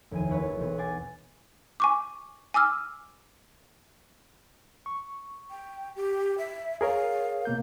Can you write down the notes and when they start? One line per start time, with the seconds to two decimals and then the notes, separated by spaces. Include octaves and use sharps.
0.11 F1 D#2 E4 G#5 D#7
0.29 F#1 F#2 E4 B4 C#5 F#6
0.57 B1 E2
0.78 F#5 G#5 D6 A6 C7
1.80 G#5 C#6 D6
2.54 G#5 D6 E6 F6
4.86 C#6
5.51 G5
5.96 G4
6.38 E5
6.81 G#4 A#4 C#5 F5
7.45 B2 A#3 G6